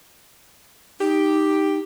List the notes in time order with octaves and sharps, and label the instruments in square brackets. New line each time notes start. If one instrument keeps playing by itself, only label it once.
[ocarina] D#4 [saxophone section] G4